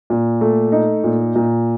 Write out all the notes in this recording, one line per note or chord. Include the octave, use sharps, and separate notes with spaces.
A#2
A3
D#4
A#2
A#2